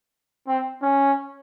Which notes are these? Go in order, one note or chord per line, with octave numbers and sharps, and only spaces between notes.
C4
C#4